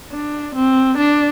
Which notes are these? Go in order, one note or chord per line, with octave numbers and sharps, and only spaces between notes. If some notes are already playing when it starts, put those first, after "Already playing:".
D4
C4
D4